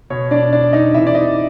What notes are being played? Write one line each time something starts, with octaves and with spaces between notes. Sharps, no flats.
B2 C#5
D4 D5
D4 D5
D#4 D#5
C3 E3 E4 E5
D5
D#4 D#5